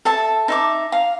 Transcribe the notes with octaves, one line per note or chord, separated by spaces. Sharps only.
A4 E5 A5
D#4 E5 D6
F5